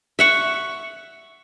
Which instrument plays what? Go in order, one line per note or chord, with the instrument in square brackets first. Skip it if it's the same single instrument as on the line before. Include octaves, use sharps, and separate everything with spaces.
[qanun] E5 F#5 C#6